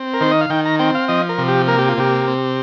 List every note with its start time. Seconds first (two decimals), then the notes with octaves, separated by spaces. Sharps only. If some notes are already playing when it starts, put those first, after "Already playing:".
Already playing: C4
0.14 A#4
0.21 D#3 C5
0.31 D#5
0.41 F5
0.50 D#3 G5
0.65 A#5
0.79 C4 G5
0.95 F5
1.08 F3 D#5
1.29 A#4
1.38 C3
1.48 G4
1.67 A#3 A#4
1.79 G4
1.89 F4
1.98 C3 G4
2.27 C4